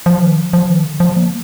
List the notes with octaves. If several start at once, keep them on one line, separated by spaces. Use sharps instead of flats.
F3
D#3
F3
F3
D#3
D3
F3
A#3